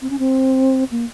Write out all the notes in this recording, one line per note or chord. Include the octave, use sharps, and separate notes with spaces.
C4
C#4
C4
A#3